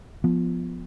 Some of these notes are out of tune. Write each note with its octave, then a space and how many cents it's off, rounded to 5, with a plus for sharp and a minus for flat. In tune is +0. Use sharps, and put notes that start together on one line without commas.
F3 +0 B3 +0